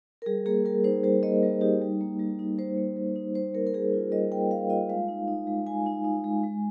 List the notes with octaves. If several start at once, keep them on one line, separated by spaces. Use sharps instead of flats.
A#4
G3 G#4
A#3 G#4
G3 A#4
D#4 C5
G3 C5
A#3 D#5
G3
D#4 G4
G3
A#3
G3
D#4
G3 C5
A#3
G3
D#4
G3 C5
A#3 A#4
A#4
G3 G#4
F4
G3 D#5
A#3 G5
G3 F5
F4 D#5
G#3 F5
D#4
D#4
G#3
G#3 G#5
D#4
D#4
G#3
G#3